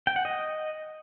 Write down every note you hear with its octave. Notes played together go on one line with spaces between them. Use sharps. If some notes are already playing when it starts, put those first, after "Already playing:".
G5
F#5
D#5